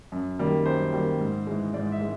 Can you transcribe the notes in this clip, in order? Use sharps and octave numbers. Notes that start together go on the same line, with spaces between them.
F#2
D#3 G3 A#3
F#2 C5
D#3 G3 A#3
G#2
E3 G#3
G#2 D5
E5
G#3